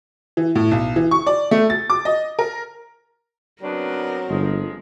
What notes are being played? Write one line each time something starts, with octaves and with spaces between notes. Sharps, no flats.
E3
A2
B1
E3
C#6
D5
A3
A6
D6
D#5
A#4
C#3 F#3 B3 C4 D4 A#4
G1 F3 G#3